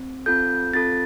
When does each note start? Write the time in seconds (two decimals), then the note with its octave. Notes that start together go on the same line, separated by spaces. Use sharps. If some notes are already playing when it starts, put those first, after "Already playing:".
Already playing: C4
0.26 C4 F4 A4 G6
0.73 C4 F4 A4 A6